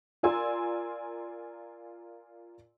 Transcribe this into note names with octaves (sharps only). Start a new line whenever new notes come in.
F4 A#4 D5 G#5 C6 E6